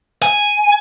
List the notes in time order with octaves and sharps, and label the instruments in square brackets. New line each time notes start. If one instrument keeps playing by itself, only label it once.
[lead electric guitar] G#5